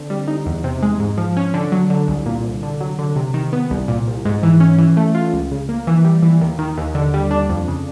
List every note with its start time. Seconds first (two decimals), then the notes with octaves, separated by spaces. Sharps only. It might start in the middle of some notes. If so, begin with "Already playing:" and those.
Already playing: D3 C4
0.10 G3
0.28 D#4
0.46 E2
0.64 C3
0.83 G#3
1.00 G#2
1.17 F3
1.37 C#4
1.54 D3
1.72 F#3
1.90 D3
2.08 C2
2.26 A#2
2.44 C2
2.63 D3
2.81 F#3
2.99 D3
3.16 C3
3.34 D#3
3.53 B3
3.71 C2
3.88 A#2
4.07 C2
4.25 G#2
4.43 E3
4.60 C#4
4.78 E3
4.97 A3
5.15 F4
5.33 C#2
5.51 C#3
5.69 A#3
5.87 E3
6.05 G3
6.23 E3
6.41 D#2
6.59 D#3
6.78 D#2
6.95 D3
7.14 G3
7.31 D4
7.49 F2
7.68 C#3